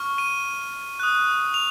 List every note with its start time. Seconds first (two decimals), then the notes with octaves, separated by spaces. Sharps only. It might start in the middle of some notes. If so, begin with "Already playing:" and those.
Already playing: C#6 F6
0.18 D#7
1.00 D#6 F#6
1.54 F7